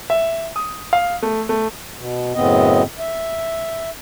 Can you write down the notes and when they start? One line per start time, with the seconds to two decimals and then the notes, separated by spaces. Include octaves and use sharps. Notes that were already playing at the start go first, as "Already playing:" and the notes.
0.10 E5
0.56 D#6
0.93 F5
1.23 A3
1.49 A3
1.97 B2
2.34 F#2 A2 C#3 B3 C4 D#5
2.99 E5